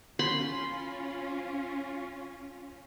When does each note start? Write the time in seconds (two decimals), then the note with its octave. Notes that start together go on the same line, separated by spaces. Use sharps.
0.19 C#4 F4 B5 C6